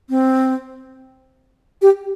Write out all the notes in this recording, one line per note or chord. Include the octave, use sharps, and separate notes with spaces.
C4
G4